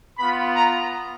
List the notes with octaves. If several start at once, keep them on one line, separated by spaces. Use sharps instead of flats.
B3 F4 B5
A#5